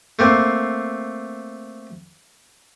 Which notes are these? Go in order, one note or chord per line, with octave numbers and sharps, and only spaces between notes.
A3 A#3 C4